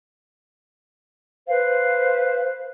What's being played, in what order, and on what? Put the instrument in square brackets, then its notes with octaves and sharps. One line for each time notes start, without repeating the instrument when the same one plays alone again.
[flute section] B4 C5 F5